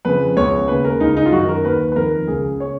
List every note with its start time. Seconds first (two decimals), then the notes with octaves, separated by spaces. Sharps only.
0.05 F2 C#3 B4
0.36 C#2 B2 C#5
0.68 D#2 C#3 B4
0.84 A#4
1.00 C#2 C#3 D#4
1.17 D#4
1.26 F4
1.32 F#2 D#3 F#4
1.48 A#4
1.64 D#2 D#3 B4
1.92 B4
1.96 F2 D#3 A#4
2.27 C#2 C#3 G#4
2.60 C#3 C#5